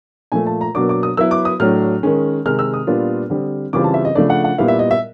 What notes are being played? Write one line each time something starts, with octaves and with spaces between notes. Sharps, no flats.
A#2 F3 A3 G#5
A5
A#5
B2 F#3 A#3 D4 D6
D6
D#6
F#3 B3 E4 E6
D6
D#6
A2 F#3 A3 D4 F6
D#3 G#3 C#4
C3 D#3 G#3 F6
E6
D#6
A#2 G3 B3 D4 F4
D3 G3 C4
C#3 E3 G3 C4 F4 D6
A5
E5
D#5
C#3 F3 A3 D4 D5
F#5
F#5
A#2 G3 B3 E4 F5
E5
D#5
E5